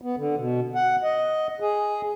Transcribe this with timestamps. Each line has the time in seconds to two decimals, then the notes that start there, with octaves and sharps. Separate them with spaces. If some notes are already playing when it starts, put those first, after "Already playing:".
0.02 B3
0.17 D3
0.36 B2
0.75 F#5
1.03 D#5
1.60 G#4